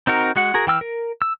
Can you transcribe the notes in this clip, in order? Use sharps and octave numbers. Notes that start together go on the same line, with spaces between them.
C4 D#4 F#4 A#4
G#3 F#4 F#5
F#4 G#4 A#4
E3 G5 E6 F6
A#4
E6